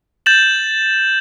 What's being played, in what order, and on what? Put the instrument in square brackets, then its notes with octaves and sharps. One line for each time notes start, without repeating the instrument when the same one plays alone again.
[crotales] G6 A6 E7 F#7